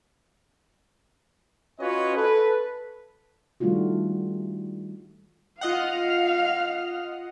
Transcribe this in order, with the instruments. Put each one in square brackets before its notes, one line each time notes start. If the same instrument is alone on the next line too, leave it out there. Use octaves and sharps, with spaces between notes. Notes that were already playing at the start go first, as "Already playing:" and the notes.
[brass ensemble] C#4 F4 F#4 B4 C#5 D#5
A4 B4
[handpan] D#3 G3 A3 D4 F4 F#4
[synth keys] F4 D#5 F#5 [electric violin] F5 F6